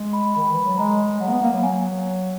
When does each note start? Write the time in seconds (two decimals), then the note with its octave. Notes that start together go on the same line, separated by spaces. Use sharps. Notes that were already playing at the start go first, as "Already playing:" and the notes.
Already playing: G#3
0.13 B5
0.35 D#3 B5
0.50 E3
0.64 F#3
0.78 G#3 A#5
1.20 F#3 F#5
1.28 A#3
1.31 B3
1.42 A#3
1.53 F#3
1.63 F#3 G#5